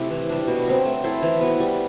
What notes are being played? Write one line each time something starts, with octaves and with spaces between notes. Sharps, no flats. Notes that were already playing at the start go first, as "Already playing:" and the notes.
Already playing: C3 A3 E4
E3
G3 D4
B2
F#3 C4
A3
E4 A4 C5
E3
B3 F#4
G3